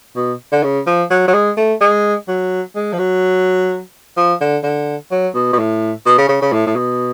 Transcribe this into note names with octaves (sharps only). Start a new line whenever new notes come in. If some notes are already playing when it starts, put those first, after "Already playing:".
B2
D3
C#3
F3
F#3
F#3
G#3
A3
G#3
F#3
G#3
F3
F#3
F3
D3
D3
F#3
B2
B2
A2
B2
C#3
C#3
C#3
A2
A2
B2